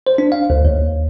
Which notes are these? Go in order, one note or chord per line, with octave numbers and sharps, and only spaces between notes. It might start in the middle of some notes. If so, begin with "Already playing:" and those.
C5
D4
F5
D2
D#2